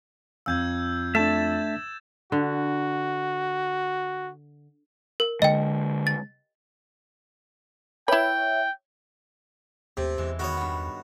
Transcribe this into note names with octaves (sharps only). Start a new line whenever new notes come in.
F2 F5 E6 G6 G#6
A3 D4 E5 A5 A6 E7
D3 F#4
A#4
D3 G#3 D#5 G5
A6
E4 B4 C#5 E5 G5
D#2 C3 A3
E2 E3 G#3
D#3 B3 F#4 C#5
G2 B3